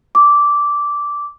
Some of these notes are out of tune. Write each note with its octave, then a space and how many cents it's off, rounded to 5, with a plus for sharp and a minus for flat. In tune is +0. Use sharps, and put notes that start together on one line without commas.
D6 -10